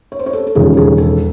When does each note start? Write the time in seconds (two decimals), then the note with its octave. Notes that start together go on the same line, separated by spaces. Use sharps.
0.12 C#5
0.19 C5
0.26 C#5
0.33 A4
0.47 A4
0.55 E1 D#2 C#3 F3 G#4
0.77 G#4
0.98 A4